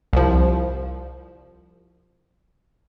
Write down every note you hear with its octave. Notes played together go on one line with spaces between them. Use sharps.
C2 F3